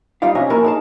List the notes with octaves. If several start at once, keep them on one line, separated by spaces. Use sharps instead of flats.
G3 D#4 F4 G4 F5
C3 F3 C#4 D#5 G#5
A#3 E4 F#4 A#4 G#5 A5
D#4 G#4 A5